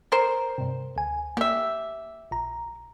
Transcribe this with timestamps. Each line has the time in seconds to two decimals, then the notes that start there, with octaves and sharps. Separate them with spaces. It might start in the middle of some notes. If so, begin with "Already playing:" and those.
0.12 A#4 C5
0.58 G2 C3
0.96 D2 G#5
1.37 A#3 G4 E5
2.31 A#1 A#5